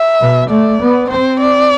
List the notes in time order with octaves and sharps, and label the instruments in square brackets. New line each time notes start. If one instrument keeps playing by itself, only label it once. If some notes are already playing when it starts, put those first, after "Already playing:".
Already playing: [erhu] E5
[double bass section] B2
[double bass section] A3 [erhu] D5
[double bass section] B3
[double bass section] C4 [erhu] C5
[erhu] D5